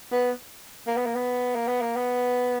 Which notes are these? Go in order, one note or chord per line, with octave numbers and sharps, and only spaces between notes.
B3
A#3
B3
A#3
B3
A#3
B3
A#3
B3